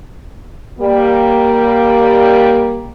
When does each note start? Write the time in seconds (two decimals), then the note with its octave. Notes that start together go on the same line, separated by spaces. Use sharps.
0.79 G3 A#3